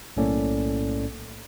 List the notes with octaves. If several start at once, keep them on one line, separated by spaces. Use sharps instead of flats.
B1 A2 A#3 C#4 A4 D5